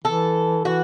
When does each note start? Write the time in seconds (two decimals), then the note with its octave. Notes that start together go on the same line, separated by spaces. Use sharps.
0.04 E3 A4
0.65 E3 F#4